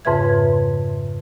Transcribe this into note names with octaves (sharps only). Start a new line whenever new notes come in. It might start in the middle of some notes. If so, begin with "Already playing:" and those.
F2 G#2 C#3 B4 E5 G#6